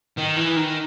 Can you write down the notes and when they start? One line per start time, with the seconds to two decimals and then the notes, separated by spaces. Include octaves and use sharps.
0.17 D#3
0.36 E3
0.56 D#3